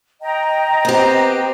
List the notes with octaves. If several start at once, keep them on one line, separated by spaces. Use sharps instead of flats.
D#5 G5 A#5
B3 C4 G4